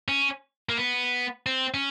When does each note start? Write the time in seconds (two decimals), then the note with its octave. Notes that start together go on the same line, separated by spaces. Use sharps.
0.08 C#4
0.69 A#3
0.77 B3
1.46 C4
1.74 C#4